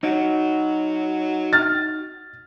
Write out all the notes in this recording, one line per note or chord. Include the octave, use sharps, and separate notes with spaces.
F#3 D#4 F#4
F6 A6